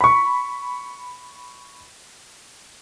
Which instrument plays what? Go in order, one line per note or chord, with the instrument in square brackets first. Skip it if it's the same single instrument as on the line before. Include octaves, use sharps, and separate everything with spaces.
[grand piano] B5 C#6